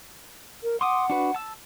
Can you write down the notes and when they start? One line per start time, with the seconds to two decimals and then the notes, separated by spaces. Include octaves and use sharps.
0.63 A#4
0.81 F#5 C6 D6 D#6
1.10 D4 F#4 B4
1.35 A5 E6